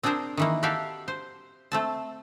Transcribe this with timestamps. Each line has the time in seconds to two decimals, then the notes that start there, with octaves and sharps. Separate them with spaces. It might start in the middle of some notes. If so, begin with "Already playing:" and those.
0.03 C4 D4 G#4 A#4 C5
0.37 D#3 E3 A#3
0.63 F#4 G4 A4 E5 F5 G5
1.08 C5
1.72 A3 C4 A5